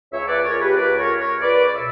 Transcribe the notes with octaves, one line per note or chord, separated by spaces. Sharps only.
C#2 C#5 E5
B4 D5
C#2 A#4 C#5
G4 B4
C#2 B4 D5
A#4 C#5
C#2
A#4 C#5
C#2 B4 D5
D5
B2 C#5 E5